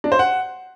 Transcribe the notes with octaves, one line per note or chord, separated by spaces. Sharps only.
D4
C5
F#5